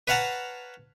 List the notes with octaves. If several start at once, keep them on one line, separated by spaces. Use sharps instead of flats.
B4 C#5 F5 F#5 A5 A#5